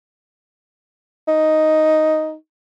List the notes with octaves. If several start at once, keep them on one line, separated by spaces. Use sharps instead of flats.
D#4